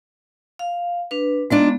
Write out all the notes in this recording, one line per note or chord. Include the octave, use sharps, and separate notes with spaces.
F5
D4 B4
G#3 B3 D4 D#4 F4